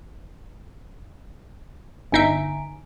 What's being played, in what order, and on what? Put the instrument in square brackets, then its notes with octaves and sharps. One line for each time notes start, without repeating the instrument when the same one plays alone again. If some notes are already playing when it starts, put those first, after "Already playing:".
[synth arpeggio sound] G1 D#4 E5 [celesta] G#5 A#5 D7